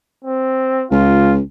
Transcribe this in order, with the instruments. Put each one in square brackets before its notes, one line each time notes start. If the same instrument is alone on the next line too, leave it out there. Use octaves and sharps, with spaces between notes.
[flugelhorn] C4
[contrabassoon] C#2 [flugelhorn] F4